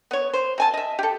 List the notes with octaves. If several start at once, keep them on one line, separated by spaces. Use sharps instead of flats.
B3 C#5
C5
C3 G#5 A5
D#5 E5
G4 A4